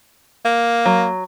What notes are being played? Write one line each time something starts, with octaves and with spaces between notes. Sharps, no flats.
A#3
F#3